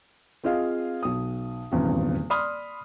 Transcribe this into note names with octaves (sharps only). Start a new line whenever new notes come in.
C4 F4 G#4 D#5 F5
B1 D#6
D#1 G#1 E2 C#3
D5 B5 C6 D#6 F6